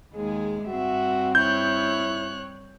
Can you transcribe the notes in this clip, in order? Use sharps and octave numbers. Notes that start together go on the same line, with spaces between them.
D#2 G#3 G#4
G2 C4 F#4 E5
E4 C#5 F#6 G6